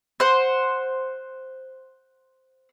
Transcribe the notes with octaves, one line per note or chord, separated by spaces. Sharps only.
C5 F#5